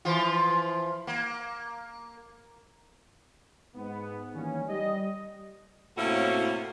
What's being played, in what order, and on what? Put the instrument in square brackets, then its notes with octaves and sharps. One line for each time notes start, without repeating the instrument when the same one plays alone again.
[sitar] E3 F3 F4
A#3
[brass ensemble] G#2 B3
D#3 E3 G3 A#3 C#4
G3 D#5
[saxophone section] A2 C3 A#3 C#4 E4 F#4